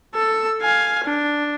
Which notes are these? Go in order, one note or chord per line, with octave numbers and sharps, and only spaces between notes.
A4 E6
F5 G#5
D4